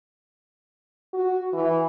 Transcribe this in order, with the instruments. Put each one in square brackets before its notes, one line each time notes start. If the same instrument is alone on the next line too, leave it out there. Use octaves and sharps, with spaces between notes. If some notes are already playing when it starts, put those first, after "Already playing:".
[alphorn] F#4
E3